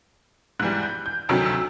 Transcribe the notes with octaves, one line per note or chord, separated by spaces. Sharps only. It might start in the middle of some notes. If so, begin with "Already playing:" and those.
G#2 E3 G3 F#6
G6
G6
D2 C3 D#3 F#3
E6